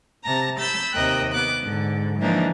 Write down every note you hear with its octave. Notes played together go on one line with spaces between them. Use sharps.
C3 A5 A#5 A#6
B5 E6 G6 A6
D#2 C3 A#4 D#5 G5 F#6
B3 D6 F#6
G#2 D3
E3 F3 G#3 A#3 D4 D#4